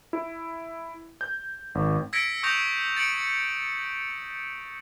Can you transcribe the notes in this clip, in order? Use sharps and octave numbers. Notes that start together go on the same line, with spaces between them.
E4
G6
G#1
E6 G#6 A#6 B6 C#7 D7
C#6 D#6 G6 A#6 F7
A6 C#7 D7 F#7